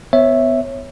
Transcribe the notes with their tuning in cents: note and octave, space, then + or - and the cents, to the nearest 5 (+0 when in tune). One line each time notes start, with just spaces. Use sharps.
B3 +25 C#5 -15 E5 +0